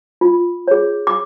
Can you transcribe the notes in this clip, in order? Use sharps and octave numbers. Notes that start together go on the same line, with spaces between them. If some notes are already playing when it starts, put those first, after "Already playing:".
F4
G#4 C#5
D6